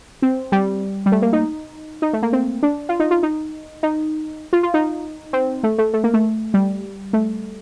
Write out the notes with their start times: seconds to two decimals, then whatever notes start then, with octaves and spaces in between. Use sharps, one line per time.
0.22 C4
0.52 G3
1.06 G3
1.12 A3
1.22 A#3
1.33 D#4
2.02 D#4
2.13 A3
2.22 A#3
2.33 C4
2.63 D4
2.89 F4
3.00 D#4
3.11 F4
3.23 D#4
3.83 D#4
4.53 F4
4.63 F4
4.74 D#4
5.33 C4
5.63 A3
5.78 A3
5.93 A3
6.04 A#3
6.14 A3
6.54 G3
7.13 A3